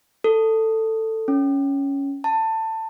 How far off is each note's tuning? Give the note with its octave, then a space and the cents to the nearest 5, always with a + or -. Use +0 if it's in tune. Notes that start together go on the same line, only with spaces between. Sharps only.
A4 +15
C#4 +5
A5 +20